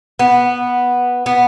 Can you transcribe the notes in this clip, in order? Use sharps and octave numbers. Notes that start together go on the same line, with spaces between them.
B3
B3